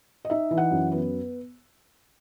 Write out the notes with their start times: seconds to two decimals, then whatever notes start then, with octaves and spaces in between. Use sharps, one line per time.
0.25 D#5
0.30 D#4 E5
0.51 E3
0.57 F#5
0.71 F#2
0.92 B3